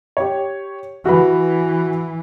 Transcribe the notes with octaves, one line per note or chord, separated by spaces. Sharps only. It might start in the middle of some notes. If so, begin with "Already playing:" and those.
G4 C#5
E3 F#4 B4